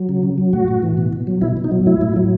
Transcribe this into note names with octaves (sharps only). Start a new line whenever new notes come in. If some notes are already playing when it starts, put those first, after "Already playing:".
Already playing: F#3
C#3
C#3
F#3
A2 F#4
A2
E3
B2
B2
F#3
B2 E4
B2
D#4
F#3
A2 E4
A2
F#3